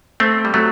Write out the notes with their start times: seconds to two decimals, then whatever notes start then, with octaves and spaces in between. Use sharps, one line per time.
0.20 A3 C4
0.45 G3
0.54 F#3 A3